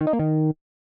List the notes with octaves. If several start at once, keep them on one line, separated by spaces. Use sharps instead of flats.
D#3
D#4
A#3
D#3